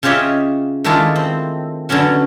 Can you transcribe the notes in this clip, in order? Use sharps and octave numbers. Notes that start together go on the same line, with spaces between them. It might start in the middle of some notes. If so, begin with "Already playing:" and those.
C#3 F4 G4 C#5 D#5 E5
D#3 G#3 A3 D4 E4 F4
C4
D3 F#3 B3 C#4 F#4